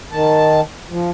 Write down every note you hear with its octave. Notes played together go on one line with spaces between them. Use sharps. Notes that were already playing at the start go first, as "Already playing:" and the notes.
D#3 A5
F3